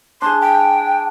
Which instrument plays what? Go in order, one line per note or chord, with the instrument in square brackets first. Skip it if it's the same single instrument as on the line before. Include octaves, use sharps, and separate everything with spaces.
[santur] D4 G#4 [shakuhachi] C6
[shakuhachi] G5